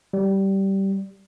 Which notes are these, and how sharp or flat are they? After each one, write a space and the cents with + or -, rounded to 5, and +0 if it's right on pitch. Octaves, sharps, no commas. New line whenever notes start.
G3 -15